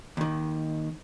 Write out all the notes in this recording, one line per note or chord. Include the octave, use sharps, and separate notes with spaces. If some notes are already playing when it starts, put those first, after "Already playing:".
D#2 D#3